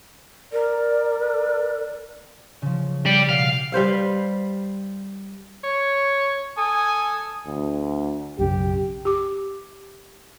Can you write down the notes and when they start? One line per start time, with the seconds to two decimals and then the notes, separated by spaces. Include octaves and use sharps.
0.52 A#4 D5
2.62 C#3 F3
3.06 G4 D5
3.29 B2 F5
3.72 G3 B4 C5 F5
5.64 C#5
6.57 A4 G#5 D#6
7.46 D2
8.39 B1 F#2 C#3 G4
9.05 G4 D6